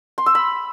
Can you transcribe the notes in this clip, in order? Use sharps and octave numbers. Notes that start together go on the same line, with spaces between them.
C6
E6
B5